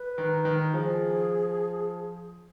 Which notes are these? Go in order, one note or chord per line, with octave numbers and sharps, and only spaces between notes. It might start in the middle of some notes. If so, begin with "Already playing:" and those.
Already playing: B4
D#3
D#3
F3 G#4